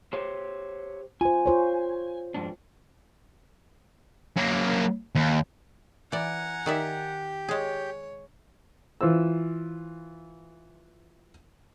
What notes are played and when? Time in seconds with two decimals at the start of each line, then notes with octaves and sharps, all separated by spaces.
0.13 G4 C5 C#5
1.21 F4 C5 G#5
1.46 F4 C5 C#5
2.34 F2 G#2 D4
4.37 F#3 A#3
5.15 D#2
6.12 E3 D5 F#5 G#5 A#5
6.66 D#3 G4 D5 E5 G5
7.49 G#3 G#4 C#5
9.01 E3 F4 C5 E6